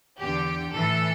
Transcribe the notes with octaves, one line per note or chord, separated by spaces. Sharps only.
E2 D3 G4
A2 E3 A4